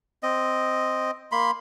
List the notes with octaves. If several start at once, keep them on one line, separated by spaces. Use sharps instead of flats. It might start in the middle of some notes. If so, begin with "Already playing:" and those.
C4 D#5
A#3 B5 C6